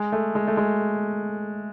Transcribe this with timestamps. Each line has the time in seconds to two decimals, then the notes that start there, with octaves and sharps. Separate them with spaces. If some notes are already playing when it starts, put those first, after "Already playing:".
Already playing: G#3
0.12 A3
0.35 G#3
0.47 A3
0.57 G#3